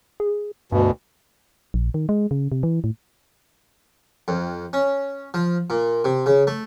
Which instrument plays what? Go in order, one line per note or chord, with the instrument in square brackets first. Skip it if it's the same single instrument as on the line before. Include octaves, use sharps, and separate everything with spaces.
[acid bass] G#4
[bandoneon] D2 B2 [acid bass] G2
[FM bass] A#1
D#3
G#3
C#3
C3
E3
A2
[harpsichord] F2
C#4
F3
A#2
C3
C#3
A3